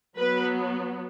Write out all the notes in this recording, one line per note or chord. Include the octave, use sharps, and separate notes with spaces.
F#3 B3 B4